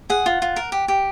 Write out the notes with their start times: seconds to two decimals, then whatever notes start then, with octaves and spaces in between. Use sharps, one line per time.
0.10 G#4 F#5
0.26 F4
0.42 F4
0.56 A#4
0.72 G4
0.88 G4